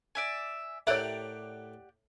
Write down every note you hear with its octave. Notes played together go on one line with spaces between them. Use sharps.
D5 E5 G#5
A2 A3 G4 A#4 C#5 D5 E5 F#5